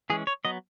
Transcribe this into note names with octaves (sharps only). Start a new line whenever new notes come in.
E3 G#3 C#4 G#4
C#5
F#3 B3 D#5